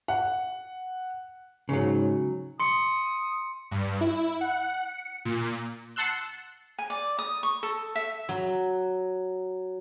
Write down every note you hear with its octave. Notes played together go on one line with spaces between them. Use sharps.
F#5
G#2 C#3 F#3
C6 D#6 C#7
G2
E4
F#5
C#7
A#2
F#5 A5 C6 E6 F#6
G#5
D5
D#6
C#6
A4
E5
F#3